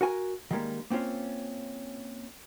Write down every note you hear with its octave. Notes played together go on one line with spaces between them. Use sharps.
F#4 A#4 G#5
D#3 G3 G#3 A#3
A#3 C4 C#4 F4